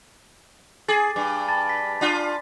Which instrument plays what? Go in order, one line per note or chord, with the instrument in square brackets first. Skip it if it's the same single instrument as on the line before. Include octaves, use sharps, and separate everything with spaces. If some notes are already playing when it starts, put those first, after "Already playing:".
[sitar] G#4 [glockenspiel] G#5 D6 A6
[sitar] G2 [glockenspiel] D6
[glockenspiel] A5 B5 A6
B6
[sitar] D4 F4